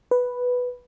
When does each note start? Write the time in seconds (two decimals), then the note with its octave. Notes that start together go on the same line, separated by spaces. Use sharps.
0.11 B4